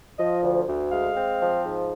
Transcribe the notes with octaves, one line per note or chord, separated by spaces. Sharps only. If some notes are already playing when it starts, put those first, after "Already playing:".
F3 D#5
D2
D2
G#3 F5
C4
F3
G#2